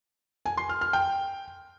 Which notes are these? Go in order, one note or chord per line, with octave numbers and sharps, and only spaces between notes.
G#5
C6
F6
F6
G5